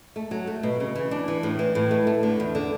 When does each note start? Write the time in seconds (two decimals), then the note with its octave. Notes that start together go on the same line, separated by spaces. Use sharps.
0.16 A3
0.31 F#3
0.47 A3
0.63 B2
0.80 C#3
0.95 E3
1.11 D4
1.28 E3
1.43 A2
1.59 E3
1.75 A2
1.91 A3
2.07 A3
2.23 D3
2.40 E2
2.55 D3